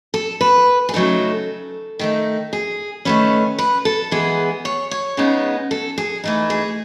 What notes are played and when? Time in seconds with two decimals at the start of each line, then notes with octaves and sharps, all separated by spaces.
0.14 A4
0.41 B4
0.89 G#4
0.94 C#3 F#3 A3 D#4 A4
1.99 D#3 A3 D#4
2.53 G#4
3.05 D#3 A3 C#4 B4
3.59 B4
3.85 A4
4.11 E3 G#3 B3 G#4
4.65 C#5
4.91 C#5
5.17 C#3 G#3 B3 D#4
5.71 A4
5.98 G#4
6.24 E3 A3 D#4
6.50 G#4